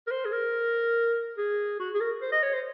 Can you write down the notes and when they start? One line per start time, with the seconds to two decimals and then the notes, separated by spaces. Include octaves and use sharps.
0.07 A#4
0.11 C5
0.25 G#4
0.32 A#4
1.38 G#4
1.79 F#4
1.94 G#4
2.01 A#4
2.22 C5
2.32 D#5
2.43 C#5
2.53 C5